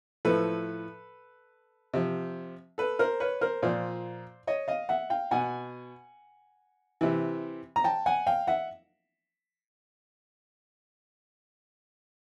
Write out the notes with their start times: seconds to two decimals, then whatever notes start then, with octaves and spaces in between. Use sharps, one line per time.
0.25 A2 F3 A4 B4
1.94 C3 F3
2.78 A4 B4
2.99 A#4 C5
3.20 B4 C#5
3.41 A#4 C5
3.63 A#2 F3 C5 D5
4.47 C#5 D#5
4.68 D#5 F5
4.89 E5 F#5
5.10 F5 G5
5.31 B2 F#5 G#5
7.01 C3 E3
7.76 A#5
7.84 G5 A5
8.06 F#5 G#5
8.27 F5 G5
8.47 E5 F#5